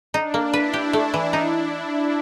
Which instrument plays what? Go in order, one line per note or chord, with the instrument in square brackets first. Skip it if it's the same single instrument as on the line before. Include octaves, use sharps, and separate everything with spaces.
[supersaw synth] D4 [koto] D#4
[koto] A#3
[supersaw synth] D4 E4 [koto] B4
[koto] G4
A3
E3
D#4